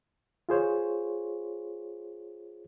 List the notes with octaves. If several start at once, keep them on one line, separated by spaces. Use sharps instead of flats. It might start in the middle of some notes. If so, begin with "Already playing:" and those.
F4 G#4 C5 C#5